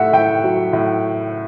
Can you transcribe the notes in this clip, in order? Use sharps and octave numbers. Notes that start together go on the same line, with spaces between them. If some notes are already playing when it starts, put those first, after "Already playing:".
Already playing: A2 A3 E5 F#5
A2 G5
F#3
A2